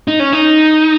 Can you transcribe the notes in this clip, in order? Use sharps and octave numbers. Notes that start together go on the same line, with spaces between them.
D#4
C#4
D#4